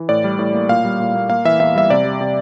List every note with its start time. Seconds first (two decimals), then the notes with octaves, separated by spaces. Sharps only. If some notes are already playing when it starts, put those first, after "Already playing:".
Already playing: E3
0.09 A2 D5
0.24 G3
0.39 A2
0.54 A#3
0.69 A#2 F5
0.85 G3
1.00 A#2
1.15 A#3
1.30 A#3 F5
1.45 E3 E5
1.60 E2 E5
1.75 G3 E5
1.90 C3 D5
2.05 G3
2.21 C3